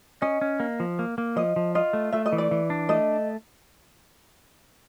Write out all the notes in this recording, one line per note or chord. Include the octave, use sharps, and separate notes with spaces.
C#4 D#5
C#4
A#3
F3
A#3
A#3
F3 D#5
F3
F4 D#5
A3
A3 E5
D#5
E3
D5
E3
D4
A3 D#5